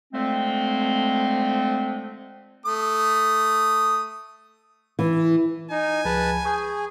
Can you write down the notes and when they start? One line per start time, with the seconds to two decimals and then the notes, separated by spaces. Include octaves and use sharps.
0.13 D3 F3 G#3 A3 C4
2.66 A3 D#6
4.99 E3
5.70 D#4 G#5
6.05 C#2 F3 G#4 B4 A5
6.45 G#4 C#6 D#6 G6